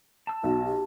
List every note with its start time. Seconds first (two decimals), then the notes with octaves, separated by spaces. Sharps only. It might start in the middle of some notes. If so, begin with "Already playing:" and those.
0.27 A5 E6
0.44 B1 F#4
0.65 G4